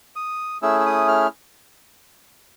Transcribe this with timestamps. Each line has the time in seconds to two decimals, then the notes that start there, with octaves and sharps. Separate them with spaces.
0.16 D#6
0.62 A3 C#4 E4 G#4 E6
0.80 E6
0.86 D#6
1.08 F6